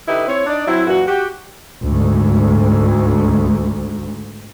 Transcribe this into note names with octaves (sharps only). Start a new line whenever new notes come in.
D3 D#4 E4 G4 B4
C4 E4 C#5
D4 D#4 D5
F#3 C4 E4
F#2 A#2 E3 F#4
F#4 G4
D2 G#2